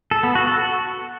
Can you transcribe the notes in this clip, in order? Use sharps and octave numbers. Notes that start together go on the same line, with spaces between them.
A4
B3
F#4
A4
F#4